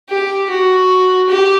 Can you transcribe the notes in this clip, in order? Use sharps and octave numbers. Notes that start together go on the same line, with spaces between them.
G4
F#4
G4